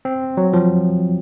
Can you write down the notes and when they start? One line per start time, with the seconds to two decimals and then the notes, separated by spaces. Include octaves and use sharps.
0.05 C4
0.37 F#3
0.53 F3